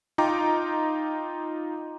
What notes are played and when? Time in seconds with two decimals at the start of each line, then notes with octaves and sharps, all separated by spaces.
0.18 D#4 F4 G5 A#5 D6